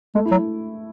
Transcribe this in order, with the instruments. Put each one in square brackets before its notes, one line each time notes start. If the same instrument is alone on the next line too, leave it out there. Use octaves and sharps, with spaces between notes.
[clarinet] G#3 [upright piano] A3
[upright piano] E4
[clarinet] F#3